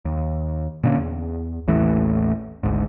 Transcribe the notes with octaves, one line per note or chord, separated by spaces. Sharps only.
D#2
A#2 D3 A#3 C#4
E2
A1 D#2 E3 A3
G#1 D2 G#2